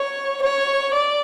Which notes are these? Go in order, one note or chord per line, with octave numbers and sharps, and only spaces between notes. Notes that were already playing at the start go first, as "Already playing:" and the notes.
Already playing: C#5
C#5
D5